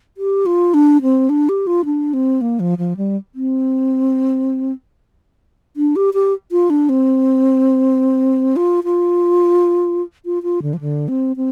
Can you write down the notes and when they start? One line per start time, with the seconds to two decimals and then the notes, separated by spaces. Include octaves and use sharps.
0.17 G4
0.46 F4
0.74 D4
1.02 C4
1.29 D4
1.49 G4
1.67 F4
1.85 D4
2.14 C4
2.41 A#3
2.60 F3
2.78 F3
2.97 G3
3.35 C4
5.77 D4
5.96 G4
6.14 G4
6.52 F4
6.70 D4
6.89 C4
8.56 F4
8.84 F4
10.25 F4
10.43 F4
10.62 D3
10.73 F3
10.81 D3
11.08 C4
11.36 C4